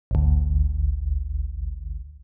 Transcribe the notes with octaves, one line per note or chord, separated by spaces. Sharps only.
G#1 D2